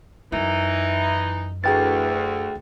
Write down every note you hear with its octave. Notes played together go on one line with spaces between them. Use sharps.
F#2 E3 D#4 E4
D2 E3 G#4 G5 A6